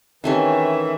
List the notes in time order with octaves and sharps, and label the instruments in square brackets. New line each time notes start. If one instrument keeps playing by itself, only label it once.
[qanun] D#3 A3 C#4 [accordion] E3 [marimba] C4 G4 [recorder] E5